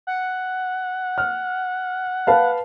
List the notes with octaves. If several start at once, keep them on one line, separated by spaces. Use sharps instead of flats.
F#5
F6
B4 F5 A5